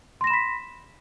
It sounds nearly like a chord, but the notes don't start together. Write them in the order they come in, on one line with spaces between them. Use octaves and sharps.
C6 A#6 E7 B5 B6